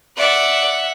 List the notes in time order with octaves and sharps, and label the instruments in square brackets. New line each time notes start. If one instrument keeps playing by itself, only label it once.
[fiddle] D5 [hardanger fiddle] E5 F#5